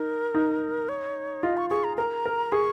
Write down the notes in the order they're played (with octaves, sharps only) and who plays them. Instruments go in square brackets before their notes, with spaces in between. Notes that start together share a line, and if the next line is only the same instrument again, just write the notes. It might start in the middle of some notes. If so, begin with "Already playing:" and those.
Already playing: [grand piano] D#4 [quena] A#4
[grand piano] D#4
[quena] C#5
[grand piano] F4 [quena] D#5
[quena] C#6
[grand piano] G#4 [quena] C#6
[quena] A#5
[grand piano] A#4 [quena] A#5
[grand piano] A#4
[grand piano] G#4 [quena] C#6